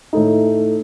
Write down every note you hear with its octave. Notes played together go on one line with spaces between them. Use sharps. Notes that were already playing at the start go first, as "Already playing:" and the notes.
A2 A3 D#4